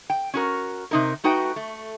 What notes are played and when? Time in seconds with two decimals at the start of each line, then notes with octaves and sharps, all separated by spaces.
0.10 G5
0.34 C#4 F#4 A#4
0.91 C3 D#4 A#4
1.24 A3 D#4 F#4 B4 G5
1.56 A3